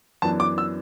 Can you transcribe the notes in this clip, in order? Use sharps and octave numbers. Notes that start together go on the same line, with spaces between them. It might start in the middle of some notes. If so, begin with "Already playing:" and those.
F#2 E3 B3 D4 A5
D6
E6